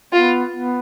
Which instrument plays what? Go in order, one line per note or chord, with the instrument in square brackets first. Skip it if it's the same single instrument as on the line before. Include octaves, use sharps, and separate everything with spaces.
[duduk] B3 [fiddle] F4
[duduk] B3